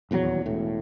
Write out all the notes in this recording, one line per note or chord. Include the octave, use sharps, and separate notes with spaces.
D#1 E2 F3 F#3
E1 A2